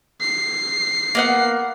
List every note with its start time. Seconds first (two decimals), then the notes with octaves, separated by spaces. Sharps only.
0.21 C7
1.15 A#3 B3 F#5